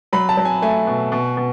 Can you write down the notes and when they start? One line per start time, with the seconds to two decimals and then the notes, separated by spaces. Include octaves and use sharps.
0.13 F#3 B5
0.29 A5
0.37 F#3
0.45 G#5
0.62 A3 G#5
0.87 B2
1.12 B2
1.37 B2